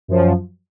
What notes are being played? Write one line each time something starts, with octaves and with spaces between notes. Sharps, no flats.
F#2 F3